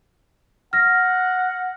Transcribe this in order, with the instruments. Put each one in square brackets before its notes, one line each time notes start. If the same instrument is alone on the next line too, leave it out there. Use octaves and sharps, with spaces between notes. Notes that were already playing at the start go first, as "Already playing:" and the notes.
[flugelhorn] F#5 [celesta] F6 A#6